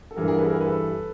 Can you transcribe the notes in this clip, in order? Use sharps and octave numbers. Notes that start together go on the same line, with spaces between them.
A4
G2 E3 G3 G#4 A#4
G#4 A#4
A4 B4
G#4 A#4
A4 B4